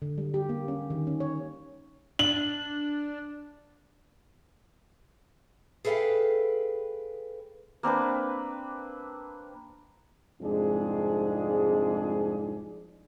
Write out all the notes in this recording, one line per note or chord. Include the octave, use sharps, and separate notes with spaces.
D3
G3
G4
A#3
C#4
D#3
C#4
C#5
D4 F#7
G#4 A4 B4 D#5 F5 G5
A#3 C4 D4 B4
C2 F2 G#2 G#3 D4 G#4